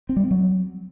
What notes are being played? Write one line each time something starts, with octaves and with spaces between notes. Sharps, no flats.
C4
G3
C4
F#3